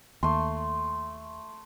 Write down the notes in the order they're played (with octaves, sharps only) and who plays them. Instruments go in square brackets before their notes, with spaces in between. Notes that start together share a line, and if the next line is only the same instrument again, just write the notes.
[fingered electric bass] D#2 [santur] A3 C6